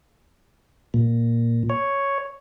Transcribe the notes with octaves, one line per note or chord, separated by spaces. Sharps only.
A#2
C#5